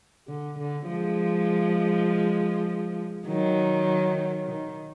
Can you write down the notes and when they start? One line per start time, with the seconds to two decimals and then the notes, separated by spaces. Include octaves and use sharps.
0.28 D3
0.59 D3
0.88 F3 G#3
3.27 D#3 F#3
4.47 D#3